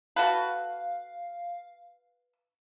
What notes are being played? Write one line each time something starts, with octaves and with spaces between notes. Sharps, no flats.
F#4 A4 B4 F5